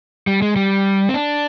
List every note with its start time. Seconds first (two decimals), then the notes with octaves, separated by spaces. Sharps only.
0.27 G3
0.42 G#3
0.56 G3
1.09 C4
1.14 D4